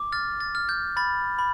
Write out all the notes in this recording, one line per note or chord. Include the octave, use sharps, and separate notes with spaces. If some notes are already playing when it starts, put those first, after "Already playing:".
Already playing: D6
F6 A6
A6
F6
G6
B5 A6
B5